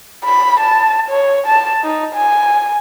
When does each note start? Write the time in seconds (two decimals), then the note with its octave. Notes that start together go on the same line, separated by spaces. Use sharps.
0.25 B5
0.60 A5
1.09 C#5
1.47 A5
1.84 D#4
2.15 G#5